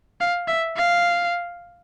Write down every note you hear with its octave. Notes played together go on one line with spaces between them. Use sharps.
F5
E5
F5